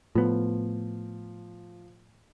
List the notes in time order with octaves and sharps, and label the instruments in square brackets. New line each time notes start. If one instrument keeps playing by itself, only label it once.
[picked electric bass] A2 B3 [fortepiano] F3